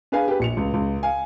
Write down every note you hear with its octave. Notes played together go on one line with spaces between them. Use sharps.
D4 G#4 B4 F5 G#5
G4 B4
A#1 C#7 F7
C#2
C#2
F5 G#5